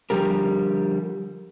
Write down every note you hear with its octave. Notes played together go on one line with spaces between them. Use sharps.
D3 F3 G3 G4 A#4